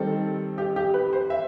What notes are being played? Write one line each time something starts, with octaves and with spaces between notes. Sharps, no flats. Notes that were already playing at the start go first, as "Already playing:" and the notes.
Already playing: D#3 G3 C4 A4
G4
G4
B4
C5
E5